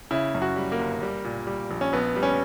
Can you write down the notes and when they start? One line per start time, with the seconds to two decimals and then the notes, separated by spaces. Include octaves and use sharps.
0.11 C#3 E4
0.35 F#2
0.42 F#4
0.56 G3
0.72 A#3
0.79 G1
1.03 G3
1.24 A#2
1.47 G3
1.71 A#1
1.81 C#4
1.93 A#1 B3
2.16 G3
2.23 C#4